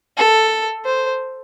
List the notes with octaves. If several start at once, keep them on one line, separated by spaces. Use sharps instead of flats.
A4
C5